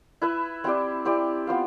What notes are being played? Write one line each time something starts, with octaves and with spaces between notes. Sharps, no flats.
E4 B4 E5
C4 E4 G4 D5
C4 E4 G4 D5
B3 F4 C5 F5